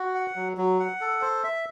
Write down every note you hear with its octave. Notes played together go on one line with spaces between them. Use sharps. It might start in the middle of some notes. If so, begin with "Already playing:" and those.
Already playing: F#4
F#5
F#3
F#3
F#5
A4
C5
E5